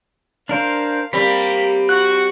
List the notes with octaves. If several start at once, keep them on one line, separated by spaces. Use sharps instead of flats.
D4 A#4 C5 F5
G3 A#3 C4 B5
F#4 F#6